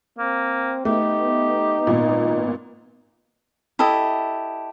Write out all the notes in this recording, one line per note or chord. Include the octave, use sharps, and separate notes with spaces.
A#3 C4
A3 B3 D#4 G4
G#1 A#2
E4 G4 A4 D#5